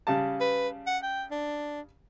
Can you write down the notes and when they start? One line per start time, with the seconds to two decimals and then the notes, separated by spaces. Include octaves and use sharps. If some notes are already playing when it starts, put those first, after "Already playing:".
0.07 C#3 G3 A5
0.41 B4
0.87 F#5
1.03 G5
1.31 D4